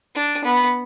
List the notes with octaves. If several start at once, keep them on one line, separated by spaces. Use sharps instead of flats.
D4
B3